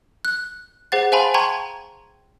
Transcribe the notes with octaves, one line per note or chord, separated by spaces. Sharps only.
F#6
G#4 C5 F#5 A6
C5 F5 G#5 A5 B5 C6
G5 A5 A#5 C6 C#6 G#6